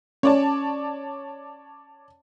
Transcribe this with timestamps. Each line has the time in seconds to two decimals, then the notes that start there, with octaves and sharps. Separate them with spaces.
0.23 C#4 C#5 D5 A5